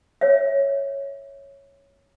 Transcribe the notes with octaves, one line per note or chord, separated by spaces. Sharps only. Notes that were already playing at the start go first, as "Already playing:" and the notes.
C#5 E5